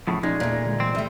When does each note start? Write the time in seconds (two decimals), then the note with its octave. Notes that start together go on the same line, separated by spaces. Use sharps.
0.07 E2 A2 C#3 F3
0.23 A#2 G#3 C#4 D#4
0.40 E2 A#2 A3
0.66 D3 G#3
0.80 E3 G#3 C4
0.95 C2 G3 A3 E5